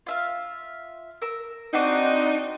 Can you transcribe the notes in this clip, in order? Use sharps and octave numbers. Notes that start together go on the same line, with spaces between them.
F4 E5 F5
A#4 E6
C4 D4 D#4 F#4 C5 D6